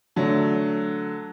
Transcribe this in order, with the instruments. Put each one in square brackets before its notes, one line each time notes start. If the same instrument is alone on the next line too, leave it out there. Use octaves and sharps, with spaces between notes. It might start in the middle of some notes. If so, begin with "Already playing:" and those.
[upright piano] D3 F#3 A3